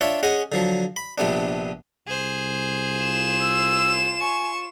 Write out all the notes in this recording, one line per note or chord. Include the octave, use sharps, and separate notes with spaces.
D4 F4 C#5 E5
C#4 G#4 D#5 F#5
D3 F3 F#3
B5
A#1 C3 B3 D4
C2 G#4 C5
F4 E7
E6
G#5 C#6